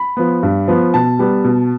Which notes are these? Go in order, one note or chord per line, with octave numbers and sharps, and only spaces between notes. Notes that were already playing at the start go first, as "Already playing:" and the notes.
Already playing: B5
F3 B3
G2
F3 B3
B2 A5
G3 B3
B2